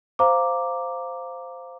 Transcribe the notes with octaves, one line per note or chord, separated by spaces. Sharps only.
C5 F5 A#5 D6